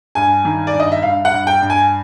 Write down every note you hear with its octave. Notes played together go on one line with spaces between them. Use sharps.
G2 G#5
D#3
D5
G2
D#5
E5
G2 F5
F#5
G2
G5
G2
G#5